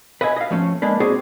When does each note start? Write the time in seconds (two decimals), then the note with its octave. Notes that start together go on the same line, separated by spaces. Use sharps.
0.21 B4 D#5 E5 F#5 G#5
0.36 D#5 F5
0.51 F3 A3 C#4
0.82 G#3 A#3 D4 B4
1.00 C4 F#4 G#4 C5 D5